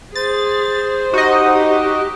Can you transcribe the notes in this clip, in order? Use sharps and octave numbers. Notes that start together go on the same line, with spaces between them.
G#4 C5 A6
D#4 F#4 G4 D#5